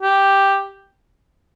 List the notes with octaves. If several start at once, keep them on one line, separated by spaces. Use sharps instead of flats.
G4